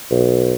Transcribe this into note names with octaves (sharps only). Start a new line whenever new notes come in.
B1